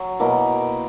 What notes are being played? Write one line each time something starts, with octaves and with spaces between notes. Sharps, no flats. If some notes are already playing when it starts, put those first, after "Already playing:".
Already playing: F#3
B2 A#3 E4